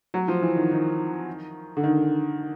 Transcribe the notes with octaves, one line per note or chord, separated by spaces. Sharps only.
F#3
F3
E3
D#3
D#3
D3
D#3